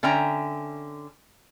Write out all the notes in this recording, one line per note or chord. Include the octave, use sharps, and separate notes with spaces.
D3 C#4 E5 G5 A#5